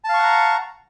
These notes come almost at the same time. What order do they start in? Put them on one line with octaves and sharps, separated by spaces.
A5 F5 C#6 F#5 A#5